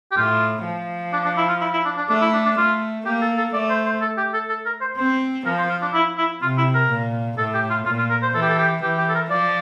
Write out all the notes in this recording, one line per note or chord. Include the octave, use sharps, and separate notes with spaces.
G4
A2 F4
F3
D4
D4
E4
F4
E4
E4
D4
D4
A3 D4
E4
D4
D4
A3 F4
A#3 G4
A4
A4
A3 D5
C5
C5
A4
G4
A4
A4
A#4
C5
C4 C5
F3 A#4
C5
F4
D4
E4
E4
C3 F4
E4
A#4
A#2
A2 A4
G4
F4
A#2 F4
F4
A#4
C5
E3 A4
G4
A4
G4
E3 G4
G4
A4
A#4
F3 D5